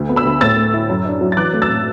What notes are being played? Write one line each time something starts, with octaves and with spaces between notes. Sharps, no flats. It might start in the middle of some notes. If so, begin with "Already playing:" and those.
Already playing: D2 A3
B3
B5 E6
D2
A2 E6 A6
A3
E4
F#2
D4
F#3
A6
E3 D6 F#6
A3
E6 A6
A2